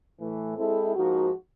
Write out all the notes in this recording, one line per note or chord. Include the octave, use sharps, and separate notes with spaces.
A2 E3 A3
G#3 C4 E4 A4
G#2 F3 A#3 D#4 F#4